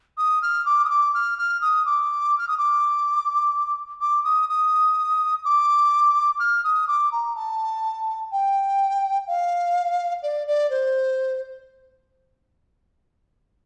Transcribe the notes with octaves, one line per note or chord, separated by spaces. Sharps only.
D#6
F6
D6
D#6
D6
F6
F6
D#6
D6
F6
D#6
D6
D6
D#6
D#6
D6
F6
D#6
D6
A#5
A5
G5
F5
D5
D5
C5